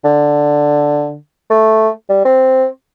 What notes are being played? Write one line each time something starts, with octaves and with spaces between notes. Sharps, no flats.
D3
A3
G3
C4